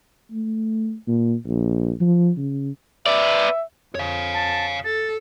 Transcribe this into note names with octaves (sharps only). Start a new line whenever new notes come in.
A3
A#2
A#1
F3
C#3
B3 D5 E5
F2 C#5 F5
A5
A4 A6